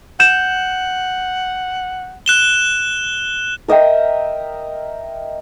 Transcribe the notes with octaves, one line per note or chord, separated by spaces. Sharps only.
F#5 G6 E7
F#6 E7 G7
A#4 D#5 E5 G5